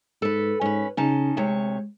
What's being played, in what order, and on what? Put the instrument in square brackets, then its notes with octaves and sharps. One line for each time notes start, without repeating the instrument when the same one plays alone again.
[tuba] G#2 [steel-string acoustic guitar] A4 B4
[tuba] G#2 [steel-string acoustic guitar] C#4 B4
[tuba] C#3 [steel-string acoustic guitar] C#4 D#4 A5
[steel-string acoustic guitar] D2 C3 C#5 [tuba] G#3